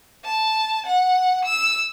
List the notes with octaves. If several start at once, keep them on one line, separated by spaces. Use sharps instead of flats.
A5
F#5
E6